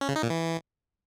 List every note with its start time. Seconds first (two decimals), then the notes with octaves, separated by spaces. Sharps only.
0.01 C#4
0.08 C#3
0.16 D#4
0.23 A#2
0.30 E3